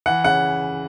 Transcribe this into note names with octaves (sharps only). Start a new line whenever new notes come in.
E3 F#5
C#3 F#5